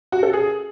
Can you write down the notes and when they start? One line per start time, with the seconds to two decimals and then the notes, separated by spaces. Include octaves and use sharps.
0.12 F#4
0.23 A4
0.33 G#4